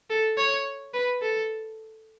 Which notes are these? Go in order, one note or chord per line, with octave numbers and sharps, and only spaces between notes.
A4
C#5
B4
A4